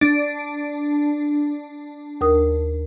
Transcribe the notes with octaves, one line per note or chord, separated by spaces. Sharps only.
D4
D#2 A#4 D#6